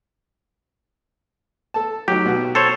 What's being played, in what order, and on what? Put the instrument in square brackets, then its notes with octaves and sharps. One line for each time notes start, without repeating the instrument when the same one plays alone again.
[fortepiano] A4 A5
[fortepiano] F#3 D#4 [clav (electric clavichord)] G4
[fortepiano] B2 F#4
[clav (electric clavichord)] A4 C5 C#5